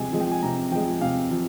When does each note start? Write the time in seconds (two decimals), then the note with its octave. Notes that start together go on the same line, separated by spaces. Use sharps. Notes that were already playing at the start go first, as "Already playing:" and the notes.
Already playing: C3 F3 G#3 G#5
0.12 F3 G#3
0.20 G5
0.32 G#5
0.42 C3 A#5
0.72 F3 G#3 G5
1.01 C3 F5
1.31 F3